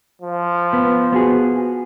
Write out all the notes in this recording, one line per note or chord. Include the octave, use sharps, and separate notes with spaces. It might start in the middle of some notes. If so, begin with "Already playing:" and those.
F3
B3
B3 F#4 G#4